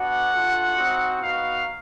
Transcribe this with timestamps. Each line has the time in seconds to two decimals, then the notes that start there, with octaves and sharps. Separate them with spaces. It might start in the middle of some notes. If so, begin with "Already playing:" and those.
Already playing: B3 D4 F#4 F#5
0.31 A3 D4 F4
0.76 C4 D#4 F#4
1.21 B3 D#4 F#4 F5